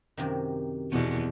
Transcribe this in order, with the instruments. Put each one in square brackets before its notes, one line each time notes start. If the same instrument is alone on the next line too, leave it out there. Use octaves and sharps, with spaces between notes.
[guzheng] F#2 C3 D#3
[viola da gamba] E2 B2